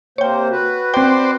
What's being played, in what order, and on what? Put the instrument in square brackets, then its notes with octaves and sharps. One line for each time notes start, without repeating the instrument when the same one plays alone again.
[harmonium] C3 A#3 C5 [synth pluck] C#5 G5
[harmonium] F#4 B4
[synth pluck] C4 G5 [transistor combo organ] C5 D5